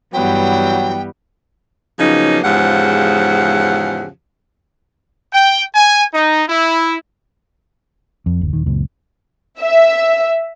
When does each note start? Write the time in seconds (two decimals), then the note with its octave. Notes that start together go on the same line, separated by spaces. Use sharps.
0.13 G2 E3 F#3 G3 B3 G5
1.99 C#3 F3 F#3 A#3 B3 D#4
2.44 E2 G#2 C#3 F3 G4 F#5
5.33 G5
5.74 G#5
6.14 D#4
6.48 E4
8.26 F2
8.41 F#1 D2
8.53 D#1 D#3
8.66 C#2 F#2 A#2
9.60 E5